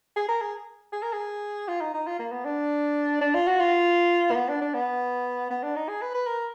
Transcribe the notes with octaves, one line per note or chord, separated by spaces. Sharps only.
G#4
A#4
G#4
G#4
A#4
G#4
F4
D#4
D#4
F4
A#3
B3
D4
D4
F4
F#4
F4
A#3
B3
D4
D4
B3
B3
D4
D#4
G#4
B4
B4
A#4